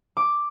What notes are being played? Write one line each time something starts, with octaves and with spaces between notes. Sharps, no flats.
D6